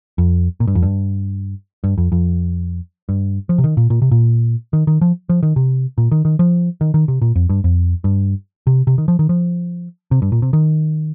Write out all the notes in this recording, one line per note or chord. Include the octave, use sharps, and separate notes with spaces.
F2
A#2
G2
F2
G2
G2
F2
F2
G2
F3
C3
D#3
A#2
A#2
C3
A#2
D#3
D#3
F3
F3
D#3
C3
A#2
D#3
D#3
F3
D#3
D#3
C3
A#2
F2
G2
F2
G2
C3
C3
D#3
F3
D#3
F3
C3
G2
A#2
C3
D#3